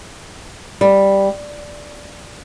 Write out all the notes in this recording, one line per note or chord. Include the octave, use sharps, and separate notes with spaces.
G3